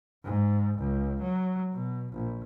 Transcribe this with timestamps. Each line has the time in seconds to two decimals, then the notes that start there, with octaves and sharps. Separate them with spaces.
0.24 G#2
0.78 C#2
1.21 F#3
1.73 B2
2.13 A#1